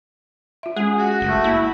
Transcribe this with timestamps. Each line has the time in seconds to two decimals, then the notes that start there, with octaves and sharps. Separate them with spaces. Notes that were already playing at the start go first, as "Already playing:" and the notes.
0.63 F4 E5
0.76 G#3 C#4 G#4
0.98 F#4 F#5
1.21 F#1 A3
1.44 A#3 E4